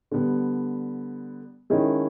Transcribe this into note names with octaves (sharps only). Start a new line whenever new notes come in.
D3 G3 B3
D#3 G#3 C#4 E4